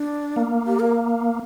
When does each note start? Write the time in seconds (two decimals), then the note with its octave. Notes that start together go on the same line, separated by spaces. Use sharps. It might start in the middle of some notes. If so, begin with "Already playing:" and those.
Already playing: D4
0.36 A#3
0.67 G4
0.79 A#4